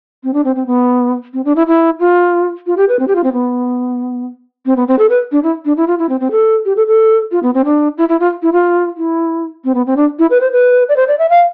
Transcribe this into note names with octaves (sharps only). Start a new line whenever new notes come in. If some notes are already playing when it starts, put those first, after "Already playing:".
C4
D4
C4
C4
B3
C4
D4
E4
E4
F4
F4
G4
B4
C4
G4
F4
C4
B3
C4
B3
C4
A4
B4
D4
E4
D4
E4
F4
E4
C4
C4
A4
G4
A4
A4
F4
B3
C4
D4
E4
E4
F4
E4
F4
E4
C4
B3
C4
D4
E4
B4
C5
B4
D5
C5
D5
E5
F5